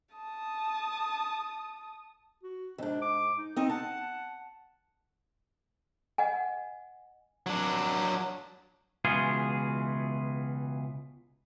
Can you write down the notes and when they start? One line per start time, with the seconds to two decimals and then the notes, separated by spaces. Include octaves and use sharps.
0.15 A5 D#6
2.43 F#4
2.78 F2 G#2 D4
3.02 D6
3.37 D#4
3.56 C4 D#4 D#6
3.70 F#5 A5
6.18 D#5 F#5 G#5
7.46 F#3 D4
9.05 C#2 B2 E3 F4 G#4